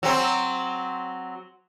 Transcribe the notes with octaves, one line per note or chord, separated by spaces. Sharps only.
F#3 C4